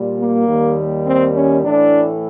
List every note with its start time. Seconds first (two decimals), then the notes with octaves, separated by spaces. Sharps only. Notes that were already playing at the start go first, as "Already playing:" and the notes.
Already playing: A#2 G3
0.17 A#3
0.46 D#2 D#3 G3
1.05 C4
1.35 C#4
1.63 A2 E3 A3 D4